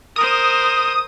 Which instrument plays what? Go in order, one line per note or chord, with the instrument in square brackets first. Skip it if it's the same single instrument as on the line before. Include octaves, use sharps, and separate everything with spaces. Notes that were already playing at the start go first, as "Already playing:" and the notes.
[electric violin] A#4 C5 [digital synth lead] D#6